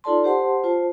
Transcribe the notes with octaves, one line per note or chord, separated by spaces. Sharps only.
D#4 F4 A4 D5 A5 C6
G4 C5 F#5 A5 C6
F4 C5 A5